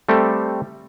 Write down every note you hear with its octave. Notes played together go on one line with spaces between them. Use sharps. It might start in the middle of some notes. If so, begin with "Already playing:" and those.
G3 A3 C4 G4 A4